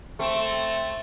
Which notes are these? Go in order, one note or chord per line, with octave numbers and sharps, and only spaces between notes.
A3 C4